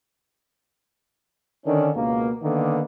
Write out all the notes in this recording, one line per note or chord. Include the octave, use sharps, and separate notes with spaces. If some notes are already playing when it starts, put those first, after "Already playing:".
D3 D#3 C#4 D4
C#2 B2 A#3
D3 D#3 A#3 B3